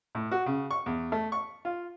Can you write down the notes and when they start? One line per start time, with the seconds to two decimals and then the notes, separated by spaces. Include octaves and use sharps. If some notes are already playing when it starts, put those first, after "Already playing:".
0.15 A2
0.31 F#4
0.46 C#3
0.71 C#6
0.86 E2
1.12 A3
1.32 C#6
1.65 F4